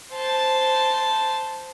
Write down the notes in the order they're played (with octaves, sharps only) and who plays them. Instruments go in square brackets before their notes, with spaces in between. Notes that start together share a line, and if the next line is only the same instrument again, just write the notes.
[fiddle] C5 A5